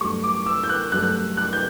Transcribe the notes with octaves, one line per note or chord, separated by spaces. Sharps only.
G2 F#3 A3 C#6
D6
E6
G6
F#6
G2 F#3 A3 F#6
F#6
F#6
G6